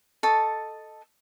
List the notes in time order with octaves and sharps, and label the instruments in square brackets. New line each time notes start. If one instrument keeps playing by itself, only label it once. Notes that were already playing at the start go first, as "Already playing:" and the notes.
[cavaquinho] A4 D#5 A5 C#6